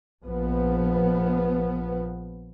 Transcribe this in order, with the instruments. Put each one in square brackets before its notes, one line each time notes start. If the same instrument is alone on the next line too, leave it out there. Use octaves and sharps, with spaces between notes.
[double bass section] A#1 F3 B3